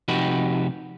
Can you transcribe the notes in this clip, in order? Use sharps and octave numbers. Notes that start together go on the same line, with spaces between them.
C3 F3 D#4 F#4 G4 B4